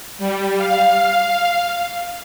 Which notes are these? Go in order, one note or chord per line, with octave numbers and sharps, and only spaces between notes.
G3
F5